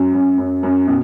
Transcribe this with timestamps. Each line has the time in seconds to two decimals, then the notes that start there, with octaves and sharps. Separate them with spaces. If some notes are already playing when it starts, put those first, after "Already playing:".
Already playing: F#2 F#3
0.14 F#2
0.38 F#2
0.63 F#2
0.88 B2